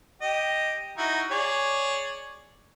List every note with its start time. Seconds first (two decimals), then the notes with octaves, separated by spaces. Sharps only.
0.22 G4 D#5
0.98 D#4 E4 F#4
1.31 G#4 C#5 D5